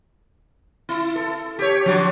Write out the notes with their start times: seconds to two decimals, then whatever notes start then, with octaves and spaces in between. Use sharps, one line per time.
0.89 E4
1.16 A4
1.59 G4 C#5
1.86 F3 F#3 D4